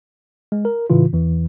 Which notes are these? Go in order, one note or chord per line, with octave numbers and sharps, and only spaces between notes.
G#3
A#4
A2 C#3 E3 F4
E2 E3